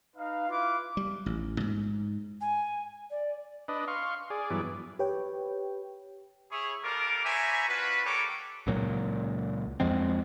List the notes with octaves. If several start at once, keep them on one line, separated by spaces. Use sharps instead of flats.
D#4 B4 F5
E4 F4 B4 F5 D6
G3
A1
G#2
G#5
D5
D4 B4 D#5
F5 C6 C#6
G#4 D5
G2 E3 F#3 B3 D5
G4 B4 C#5 G5
E4 G#4 C#5
G3 F4 A4 A#4 D6
C5 C#5 E5 G#5 A#5 B5
D4 F4 F#4 B4
G3 A#3 A4 C#5 G5 D6
C#2 A#2 F#3
F2 F3 G#3 C4